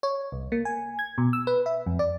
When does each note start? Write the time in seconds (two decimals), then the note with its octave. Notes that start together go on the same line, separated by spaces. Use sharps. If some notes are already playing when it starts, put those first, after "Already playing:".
0.03 C#5
0.32 C2
0.52 A#3
0.65 G#5
0.99 G#6
1.18 B2
1.33 E6
1.47 B4
1.66 E5
1.86 F2
1.99 D5